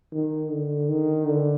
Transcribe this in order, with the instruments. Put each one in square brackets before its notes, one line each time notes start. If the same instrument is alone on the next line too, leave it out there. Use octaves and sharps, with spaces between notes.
[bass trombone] D#3
D3
D#3
D3